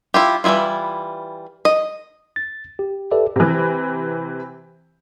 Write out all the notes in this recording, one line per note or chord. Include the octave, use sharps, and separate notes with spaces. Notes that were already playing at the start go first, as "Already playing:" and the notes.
E4 F4 G4
E3 G3 G#3 E4 F4
D#5
A6
G4
G4 A4 B4 D5 E5
C3 E3